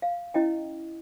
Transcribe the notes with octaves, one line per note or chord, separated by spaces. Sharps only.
F5
C#4 E4 D#5 G5